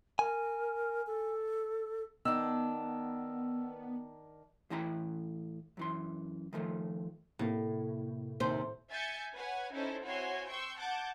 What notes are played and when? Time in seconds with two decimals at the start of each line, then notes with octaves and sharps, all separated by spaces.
0.19 A#4 G#5
1.07 A4
2.25 D#3 B3 D4 E6
4.70 A2 E3 E4 G5 A#5 B5
5.77 F#2 E3 C6
6.53 D#3 F3 A3 F4
7.39 A2 C3 A#3
8.40 D#2 C3 D#3 C5
8.90 E5 G#5 G6 A6 C#7
9.34 B4 C#5 F#5 G#5
9.73 C#4 D#4 E4 A4 C5
10.03 C4 E4 F#4 C#5 G#5 C6
10.47 G5 C6 C#6 E6 C#7
10.78 F#5 A5 D6 G6 G#6